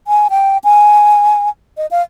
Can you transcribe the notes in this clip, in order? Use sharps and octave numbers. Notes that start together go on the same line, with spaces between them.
G#5
G5
G#5
D#5
F5